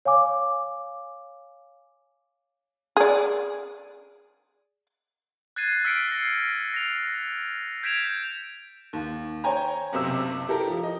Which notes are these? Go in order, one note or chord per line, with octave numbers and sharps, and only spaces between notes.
C#5 F5 G#5 D6
G#4 D5
F#6 G#6 A6 C7 D#7
E6 F6 B6 C#7 D7
A#6 C7
A#6 F7
G6 G#6 B6 D7 E7 F7
D#2
C5 C#5 G5 G#5 A#5
F#1 B1 C3 C5 E6
E4 G4 A4 A#4
F3
D#5